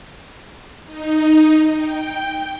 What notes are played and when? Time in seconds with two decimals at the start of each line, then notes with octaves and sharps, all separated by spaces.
0.86 D#4
1.76 G5